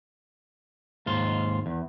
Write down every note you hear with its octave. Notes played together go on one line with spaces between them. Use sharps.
D#2 G#2 F4
E2